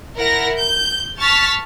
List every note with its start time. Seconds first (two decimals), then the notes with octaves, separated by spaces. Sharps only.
0.17 E4 A#4 F#5 A#6
0.55 G6
1.19 A5 C#6 F6 A6 B6